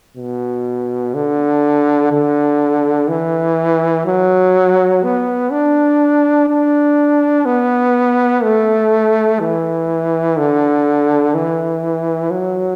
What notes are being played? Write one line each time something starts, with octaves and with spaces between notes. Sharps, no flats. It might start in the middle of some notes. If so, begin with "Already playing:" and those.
B2
D3
D3
E3
F#3
B3
D4
D4
B3
A3
E3
D3
E3
F#3